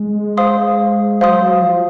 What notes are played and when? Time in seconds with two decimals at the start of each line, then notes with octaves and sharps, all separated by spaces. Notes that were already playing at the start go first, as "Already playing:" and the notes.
Already playing: G#3
0.37 C5 F5 C6 D#6
1.21 F#3 C5 F5 C6 D#6
1.62 F3